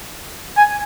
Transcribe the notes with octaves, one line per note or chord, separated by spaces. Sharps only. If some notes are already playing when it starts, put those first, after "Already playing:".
G#5